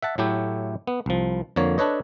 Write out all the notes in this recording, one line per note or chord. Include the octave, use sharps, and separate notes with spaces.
E5 F#5 A5
A2 F#3 A3 E4 G4
B3
C2 F3
F2 D3 A#3 C#5
D4 A4 B4 C#5 D#5